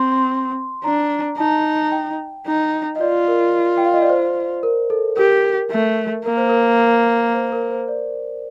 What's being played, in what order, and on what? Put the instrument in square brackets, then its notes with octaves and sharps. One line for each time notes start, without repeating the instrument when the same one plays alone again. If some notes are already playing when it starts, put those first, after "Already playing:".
Already playing: [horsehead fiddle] C4 [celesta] C6
[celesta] C6
[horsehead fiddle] D4 [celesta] A#5
[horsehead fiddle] D#4 [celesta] A5
[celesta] G5
[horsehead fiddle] D#4
[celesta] D#5
[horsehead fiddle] F4 [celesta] D5
[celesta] A#4
G5
F5
D#5
D5
C5
A#4
A4
[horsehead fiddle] G4 [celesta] A#4
[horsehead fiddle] A3
[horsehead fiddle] A#3 [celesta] A#4
[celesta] C5
A#4
A#4
C5
A#4
C5
D5